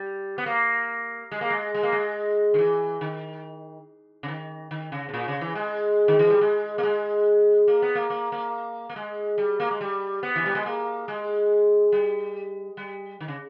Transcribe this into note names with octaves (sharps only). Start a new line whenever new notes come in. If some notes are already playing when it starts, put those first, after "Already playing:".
Already playing: G3
B3
A#3
G#3
A#3
G#3
G#3
A#3
G#3
D#3
E3
D#3
C#3
D#3
D#3
C#3
B2
A#2
C#3
E3
G#3
D#3
E3
G3
G#3
A#3
G#3
A#3
B3
A#3
A#3
A#3
A#3
G#3
G3
A#3
G#3
G3
B3
E3
G3
G#3
A#3
G#3
G3
G3
D#3
C#3